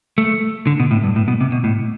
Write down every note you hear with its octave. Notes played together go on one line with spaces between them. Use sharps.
A3
D3
B2
A2
G2
A2
B2
C3
B2
A2